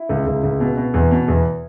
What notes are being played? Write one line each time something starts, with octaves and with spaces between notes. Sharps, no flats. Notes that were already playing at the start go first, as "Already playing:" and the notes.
Already playing: E4
C#2
C#2
C#2
B2
B2
E2
B2
E2